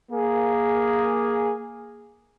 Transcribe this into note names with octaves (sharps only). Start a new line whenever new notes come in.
A#3 G#4